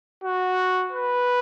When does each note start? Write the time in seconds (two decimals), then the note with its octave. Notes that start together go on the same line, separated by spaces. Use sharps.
0.24 F#4
0.92 B4